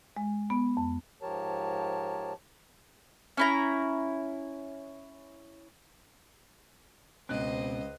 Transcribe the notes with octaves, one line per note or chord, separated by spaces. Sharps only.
G#3
B3
F2
G#2 F3 G4 A#4 C#5 A5
C#4 E4 A#5
C#2 B2 C4 C5 D#5 F#6